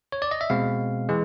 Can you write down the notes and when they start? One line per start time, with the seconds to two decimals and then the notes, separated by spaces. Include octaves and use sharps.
0.12 C#5
0.22 D5
0.31 D#5
0.41 E5
0.50 B2 G#3 C4 F5
1.09 E3 G#3